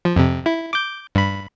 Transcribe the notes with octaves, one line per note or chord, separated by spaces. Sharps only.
F3
F2 C3
E4
D6 G6
G2 B5